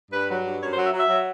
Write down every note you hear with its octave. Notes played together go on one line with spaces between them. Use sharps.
G2 B4
F#3
G2
F#2 C#5
C5
F#3
E5
F#3
E5
F#3